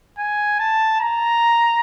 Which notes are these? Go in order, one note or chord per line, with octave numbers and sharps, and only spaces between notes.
G#5
A5
A#5